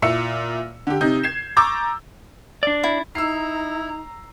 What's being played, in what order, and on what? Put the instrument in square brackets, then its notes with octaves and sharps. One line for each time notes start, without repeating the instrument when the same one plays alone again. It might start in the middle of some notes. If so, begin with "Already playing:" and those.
[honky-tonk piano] A#2 E4 E6 C#7
D3 G4
C3 D#4 G6
G#6 C7 E7
A#5 C#6 D6 E6 G6 A6
[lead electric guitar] D4 D5
[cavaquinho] E4
[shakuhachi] D#4 [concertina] E4 [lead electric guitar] A#5 [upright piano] E6 C7